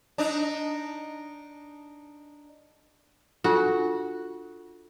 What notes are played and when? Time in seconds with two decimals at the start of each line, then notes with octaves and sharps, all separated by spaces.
0.18 D4 D#4
3.44 D4 F4 F#4 A4